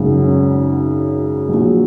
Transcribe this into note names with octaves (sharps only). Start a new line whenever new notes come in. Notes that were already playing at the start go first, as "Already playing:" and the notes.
Already playing: G#1 F#2 C#3 F#3
C#4
A#1 A#2 F#3